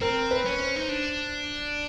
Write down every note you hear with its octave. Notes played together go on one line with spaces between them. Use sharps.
C4 A#4
B4
C#4
C5
D#4
D4